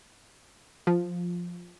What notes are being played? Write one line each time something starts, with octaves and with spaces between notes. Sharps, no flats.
F3